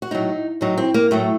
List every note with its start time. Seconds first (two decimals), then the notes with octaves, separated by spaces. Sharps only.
0.02 F#4
0.11 A2 F#3 D#4
0.61 A2 F#3 D#4
0.77 C4
0.94 A#3
1.11 A2 F#3 A3